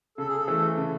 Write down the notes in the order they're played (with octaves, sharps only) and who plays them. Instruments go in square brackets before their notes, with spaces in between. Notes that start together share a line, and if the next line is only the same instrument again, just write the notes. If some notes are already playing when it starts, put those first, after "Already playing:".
[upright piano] C#3 [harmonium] A4
[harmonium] G#4
A4
[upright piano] E3 A3
C#3